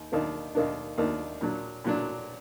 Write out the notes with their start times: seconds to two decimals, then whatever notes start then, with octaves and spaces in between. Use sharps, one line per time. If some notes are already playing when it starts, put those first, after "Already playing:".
Already playing: D#2
0.12 D#2 D#3 A#3 D4
0.55 D#2 D#3 A#3 D4
0.98 D#2 D#3 A#3 D4
1.41 A#2 F#3 D4
1.84 A#2 F#3 D4